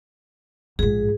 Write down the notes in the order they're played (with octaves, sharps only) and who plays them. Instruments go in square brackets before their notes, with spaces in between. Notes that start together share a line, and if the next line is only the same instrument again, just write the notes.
[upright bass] A#1 G#2 [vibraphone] G#4